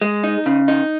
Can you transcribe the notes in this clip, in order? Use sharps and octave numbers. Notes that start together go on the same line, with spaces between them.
G#3
D#4
C#3
D#4